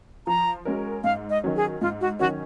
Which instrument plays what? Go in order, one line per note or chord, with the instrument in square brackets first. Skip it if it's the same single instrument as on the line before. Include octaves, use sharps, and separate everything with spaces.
[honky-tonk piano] F3 [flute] A#5
[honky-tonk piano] G#3 C#4 F#4 A#4
[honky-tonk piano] G#2 [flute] F5
[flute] D#5
[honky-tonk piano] D#3 F#3 C#4
[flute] G#4
[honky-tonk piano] G#2 [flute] F4
[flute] F#4
[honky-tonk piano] D#3 F#3 C#4 [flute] F#4